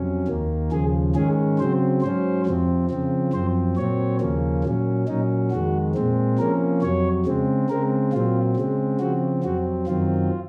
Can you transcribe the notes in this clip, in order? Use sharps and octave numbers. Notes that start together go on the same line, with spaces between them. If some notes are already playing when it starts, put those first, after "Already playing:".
Already playing: F2 C3 F#3 C#4
D#2 D#3 A#3
D#2 C#3 F3 G#4
G#2 D#3 G#3 C#4 G#4
C#3 F#3 C4 C5
G#2 F#3 C#4 C5
F2 C3 F3 C4
C#3 F3 C4
F#2 F3 C4 C5
A#2 F#3 C4 C#5
D#2 C#3 F3 A#3 C#4
A#2 F#3 C#4
A#2 F#3 C#4 D#4
F2 D#3 G#3 F#4
A#2 G#3 C4
C3 F3 A#3 C#4 A#4
F2 C3 F#3 C#5
C#3 G#3 C4
C#3 G#3 C4 A#4
A#2 F#3 C4 F4
C#3 G#3 C4
C#3 F3 C4 F#4
F2 C3 F#3 C4 F#4
F#2 D#3 F#3 C4 F4